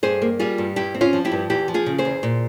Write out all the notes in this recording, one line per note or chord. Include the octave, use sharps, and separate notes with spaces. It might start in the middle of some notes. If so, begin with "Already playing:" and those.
G2 G#4 C5
A#3
G3 F4 G#4
G2
G2 E4 G4
C4
C#4 F4
F3
E4 G4
G2
E2 E4 G4
F3
F4 G#4
C#3
G#4 C5
E2
A#2